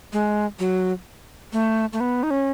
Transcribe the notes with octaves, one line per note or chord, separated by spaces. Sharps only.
G#3
F#3
A3
A3
B3
D#4
C#4